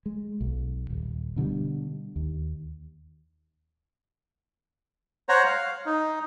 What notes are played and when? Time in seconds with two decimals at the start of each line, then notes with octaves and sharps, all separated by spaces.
0.06 G#3
0.41 B1
0.90 D#1
1.36 B2 D3 F3 G3
2.16 D#2
5.29 C5 C#5 F#5 A#5
5.46 F5
5.86 D#4